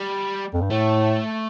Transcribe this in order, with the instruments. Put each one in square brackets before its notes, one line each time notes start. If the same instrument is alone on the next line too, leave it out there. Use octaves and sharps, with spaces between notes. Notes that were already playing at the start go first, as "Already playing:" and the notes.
Already playing: [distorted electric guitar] G3
[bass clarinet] F2
G2
[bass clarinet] A2 [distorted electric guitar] A3